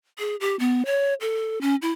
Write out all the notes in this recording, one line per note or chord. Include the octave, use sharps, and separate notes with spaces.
G#4
G4
B3
C#5
A4
C#4
E4